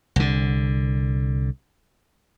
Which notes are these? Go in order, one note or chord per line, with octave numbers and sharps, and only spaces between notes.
C2 D3